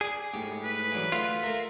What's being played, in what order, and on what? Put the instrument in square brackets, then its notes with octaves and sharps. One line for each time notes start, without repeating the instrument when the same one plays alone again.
[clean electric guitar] G#4 [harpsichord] D5
[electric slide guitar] G#2 A3 [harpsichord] G4
[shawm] B4
[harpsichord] E3 F#3 D5
[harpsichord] D3 A3 [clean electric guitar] F4
[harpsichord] A3 E5 [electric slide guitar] A#4